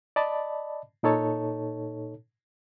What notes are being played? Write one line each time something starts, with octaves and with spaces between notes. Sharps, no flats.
D5 D#5 A5 B5
A#2 D#4 A4 C#5 A5